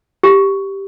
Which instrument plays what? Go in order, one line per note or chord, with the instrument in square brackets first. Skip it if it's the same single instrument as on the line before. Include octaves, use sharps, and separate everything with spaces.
[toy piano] G4